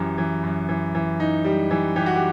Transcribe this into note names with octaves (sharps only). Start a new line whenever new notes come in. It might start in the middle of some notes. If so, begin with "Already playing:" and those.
Already playing: F#2 E3 G4
E3
F#2
E3
E3
D#4
G3
E3
E3 G4
F#4
G4